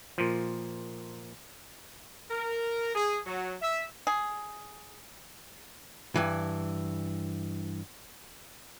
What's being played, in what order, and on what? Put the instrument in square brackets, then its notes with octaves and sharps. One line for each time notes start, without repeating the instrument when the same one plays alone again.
[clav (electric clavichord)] A#2 F3
[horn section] A#4
G#4
F#3
E5
[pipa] G#4
[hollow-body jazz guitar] G2 E3